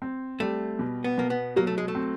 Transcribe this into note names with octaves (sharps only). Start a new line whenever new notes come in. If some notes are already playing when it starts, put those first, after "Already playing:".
C4
G3 A3
B2
B3
B2 A#3
B3
F#3 A#3
A3
G#3
A3
C4